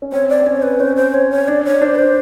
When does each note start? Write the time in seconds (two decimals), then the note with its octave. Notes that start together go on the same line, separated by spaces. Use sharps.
0.02 C#4
0.12 C4 C#5
0.29 D5
0.41 C4
0.46 C#4 C#5
0.62 B4
0.80 C#4 C5
0.96 C5
1.14 C#5
1.31 C#5
1.48 D4 D5
1.65 C#5
1.81 D4 C5
1.95 B4
1.98 C5